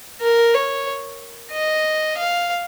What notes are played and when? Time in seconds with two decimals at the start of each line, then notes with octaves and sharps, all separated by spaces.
0.21 A#4
0.55 C#5
1.52 D#5
2.18 F5